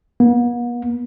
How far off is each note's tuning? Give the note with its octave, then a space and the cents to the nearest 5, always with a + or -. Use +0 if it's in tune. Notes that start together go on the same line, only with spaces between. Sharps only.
B3 -45